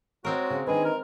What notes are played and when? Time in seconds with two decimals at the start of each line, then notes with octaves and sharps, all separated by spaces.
0.25 G#3 C4 F#4 A#4 C#5
0.50 C#3
0.67 D#3 D4 G#4 B4 D#5
0.85 A#4